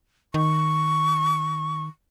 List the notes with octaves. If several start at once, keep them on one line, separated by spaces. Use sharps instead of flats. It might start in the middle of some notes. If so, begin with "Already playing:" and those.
D#3 C#6